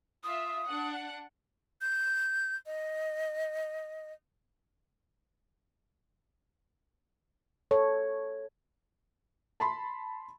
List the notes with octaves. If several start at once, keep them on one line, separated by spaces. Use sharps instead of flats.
F4 E5 D#6
D4 F#5
G6
D#5
A4 C#5
A5 B5 C6